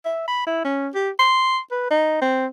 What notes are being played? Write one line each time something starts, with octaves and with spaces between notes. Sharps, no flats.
E5
B5
E4
C#4
G4
C6
B4
D#4
C4